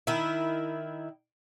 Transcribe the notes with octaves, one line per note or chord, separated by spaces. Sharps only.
D#3 E4